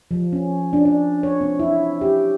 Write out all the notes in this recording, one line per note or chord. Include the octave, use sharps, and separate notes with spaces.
F3
C#4
D4
D4
C#5
C4
E4
G4